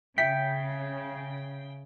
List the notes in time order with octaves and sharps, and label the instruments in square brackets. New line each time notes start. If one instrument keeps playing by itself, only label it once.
[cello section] C#3 [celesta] E5 C#7 [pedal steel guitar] G5 [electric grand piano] B6